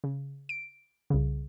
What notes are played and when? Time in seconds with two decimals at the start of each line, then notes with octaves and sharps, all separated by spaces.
0.04 C#3
0.49 D7
1.10 C2 C#3